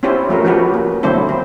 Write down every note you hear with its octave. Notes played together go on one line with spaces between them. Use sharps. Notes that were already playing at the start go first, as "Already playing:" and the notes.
C4 C#4 E4 G4 C5
F3 A3 F#4 A#4
F3 B3 C#4 F#4 G4 B4
A#3
D3 F#3 A3 C4 E4 C5
C4